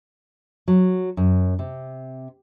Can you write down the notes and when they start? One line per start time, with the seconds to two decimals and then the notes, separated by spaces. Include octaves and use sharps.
0.68 F#3
1.17 F#2
1.59 C3